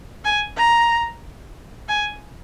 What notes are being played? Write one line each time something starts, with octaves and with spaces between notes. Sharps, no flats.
G#5
A#5
G#5